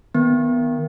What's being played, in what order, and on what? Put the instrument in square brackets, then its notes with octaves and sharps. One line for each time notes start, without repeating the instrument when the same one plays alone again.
[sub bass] D#3 [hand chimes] B3